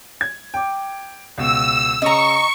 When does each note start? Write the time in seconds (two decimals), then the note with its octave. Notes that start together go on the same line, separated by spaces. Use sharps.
0.21 G#6
0.54 G5 D6
1.38 C#2 B2 E6
2.02 C#3 D#5 A#5 C#6